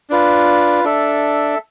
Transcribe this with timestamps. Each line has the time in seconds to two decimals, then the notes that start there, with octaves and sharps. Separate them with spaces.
0.10 D4 F4 B4
0.84 D4 A4 E5